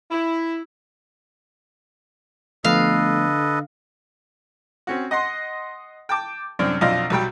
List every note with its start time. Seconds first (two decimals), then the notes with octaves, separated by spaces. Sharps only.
0.11 E4
2.64 D3 F3 A3 B3 A4 B4 D#5 F5
4.87 C4 C#4 F#4
5.11 D#5 F#5 C6
6.09 G5 A5 D6
6.59 C2 F#2 C4 D4
6.81 B1 F2 D4 F4 D#5
7.10 B1 F#3 G3 G5